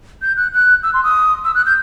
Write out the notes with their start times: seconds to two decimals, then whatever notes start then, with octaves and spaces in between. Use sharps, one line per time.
0.22 G6
0.37 F#6
0.53 F#6
0.83 E6
0.94 C6
1.04 D#6
1.45 E6
1.55 F#6
1.66 G6